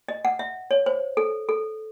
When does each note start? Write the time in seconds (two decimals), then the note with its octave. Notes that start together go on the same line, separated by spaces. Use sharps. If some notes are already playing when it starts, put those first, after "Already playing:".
0.08 D#5
0.25 F#5
0.39 E5
0.71 C#5
0.86 C5
1.17 A4
1.49 A4